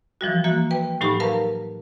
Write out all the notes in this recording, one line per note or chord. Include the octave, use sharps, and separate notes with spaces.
E3 F3 G3 F#4
E3 A#3 F#4
B4 G5
A2 F#3 D#4 G4 B5
A#4 B4 F5 A5 A#5